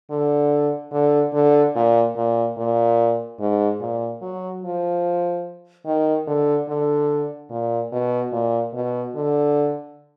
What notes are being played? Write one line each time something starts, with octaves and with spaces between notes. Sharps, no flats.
D3
D3
D3
A#2
A#2
A#2
G#2
A#2
F#3
F3
D#3
D3
D3
A#2
B2
A#2
B2
D3